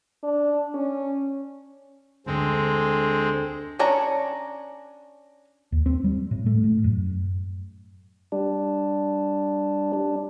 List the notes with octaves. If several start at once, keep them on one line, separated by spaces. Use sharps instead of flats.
D4
C#4
D2 D3 G#3 C4
C#4 D4 C#5 A#5
D#2
C4
G3
A2
A3
A2
F#2
G3 D4
D4